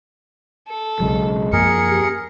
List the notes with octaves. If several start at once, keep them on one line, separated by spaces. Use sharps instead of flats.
A4
B1 C#3 F#3 G#3
F#2 F3 A#3 G#4 A#4 C#7
G4